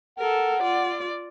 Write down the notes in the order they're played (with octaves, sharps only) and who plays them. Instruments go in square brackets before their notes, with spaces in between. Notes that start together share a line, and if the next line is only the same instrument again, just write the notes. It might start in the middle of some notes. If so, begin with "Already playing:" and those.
[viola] A4 A#4 [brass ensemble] F#5
[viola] F4 D5